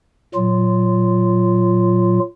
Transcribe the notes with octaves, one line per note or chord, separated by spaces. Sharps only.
A#2 F#3 F4